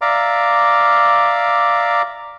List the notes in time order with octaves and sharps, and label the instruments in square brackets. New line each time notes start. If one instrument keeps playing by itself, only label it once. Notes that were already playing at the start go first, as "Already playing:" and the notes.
[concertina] D5 E5 F5 A#5 D6